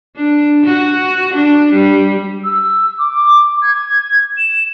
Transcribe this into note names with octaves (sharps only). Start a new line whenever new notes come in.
D4
F#4
D4
G3
E6
D6
G#6
E7